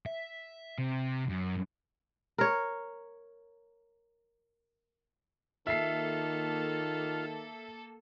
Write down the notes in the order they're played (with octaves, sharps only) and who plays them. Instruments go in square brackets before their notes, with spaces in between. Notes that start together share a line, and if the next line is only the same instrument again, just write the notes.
[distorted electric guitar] E5
C3
F#2
[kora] A#4 C#5
[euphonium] D#3 [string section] A#3 A4 [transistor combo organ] F4 [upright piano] E5 C7